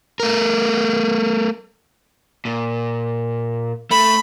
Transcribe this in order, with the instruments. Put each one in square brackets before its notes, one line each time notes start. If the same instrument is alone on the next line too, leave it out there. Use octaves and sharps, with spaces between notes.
[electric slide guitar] A3 A#4
[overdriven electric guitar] A#2
[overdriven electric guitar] A3 [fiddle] B5